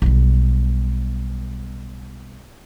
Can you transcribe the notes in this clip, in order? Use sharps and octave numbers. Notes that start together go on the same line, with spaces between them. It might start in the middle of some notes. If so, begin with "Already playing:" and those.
B1 G3